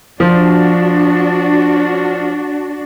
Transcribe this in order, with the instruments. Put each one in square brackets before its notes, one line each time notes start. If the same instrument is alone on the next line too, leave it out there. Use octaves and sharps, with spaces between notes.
[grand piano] F3 [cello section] D4 F#4